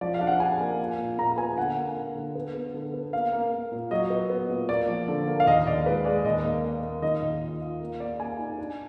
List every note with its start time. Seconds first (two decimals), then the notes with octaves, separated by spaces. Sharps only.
0.01 F3 D5
0.14 F5
0.21 D4
0.27 F#5
0.40 D4 G#5
0.60 A#3
0.79 F4
0.99 A#2
1.18 A#2 A#5
1.38 B3 G#5
1.57 D3 F#5
1.77 A#3
1.96 A#3
2.15 D3
2.35 B3
2.55 B3
2.74 D3
2.94 B3
3.13 A#3 F5
3.32 A#3
3.52 A#3
3.72 A#2
3.91 F#3 D#5
4.10 B3
4.30 B3
4.50 A#2
4.69 A#3 D5
4.88 F3
5.08 D3
5.27 A#3
5.40 F5
5.46 D#2 D#5
5.67 D#2 D5
5.86 G#3 B4
6.05 G#3 D5
6.25 D#2 D#5
6.44 A#3
6.64 A#3
6.83 A#3
7.02 D#3 D#5
7.23 D#2
7.41 F4
7.61 F4
7.81 A#3
8.00 A#3 D5
8.19 A#3 G#5
8.39 D#4
8.58 D4